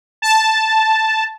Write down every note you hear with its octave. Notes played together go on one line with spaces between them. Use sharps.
A5